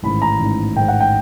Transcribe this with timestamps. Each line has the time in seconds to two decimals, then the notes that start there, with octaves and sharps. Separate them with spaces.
0.03 A1 G#2 D#3 B5
0.22 A#5
0.39 A1 G#2 D#3
0.76 A1 G#2 D#3 G5
0.88 F#5
1.00 G5